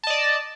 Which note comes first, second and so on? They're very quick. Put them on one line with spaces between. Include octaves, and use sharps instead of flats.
A5 D#5 D5